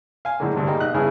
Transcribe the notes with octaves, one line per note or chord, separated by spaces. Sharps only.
F5 G#5
F#2 A2 D3 G#3 A#3
D2 G2 C3
G3 A#3 D#4 G4 G#4
B1 D#5 F#6
G2 C#3 B3 E4 G#4 F6